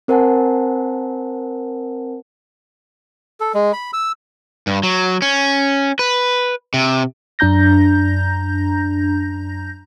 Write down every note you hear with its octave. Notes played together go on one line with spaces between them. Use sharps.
C4 A#4 C5 F#5 G#5 A5
A4
G#3
B5
E6
G2
F#3
C#4
B4
C3
F#2 D4 A#5 G6 A#6